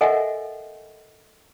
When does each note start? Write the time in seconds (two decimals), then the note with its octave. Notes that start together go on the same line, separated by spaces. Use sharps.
0.01 A4 A#4 D#5 E5 F#5 G#5